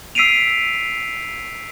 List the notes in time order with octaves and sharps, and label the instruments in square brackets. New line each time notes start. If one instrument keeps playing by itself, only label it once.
[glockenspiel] E6 B6 C7 D7 D#7 F7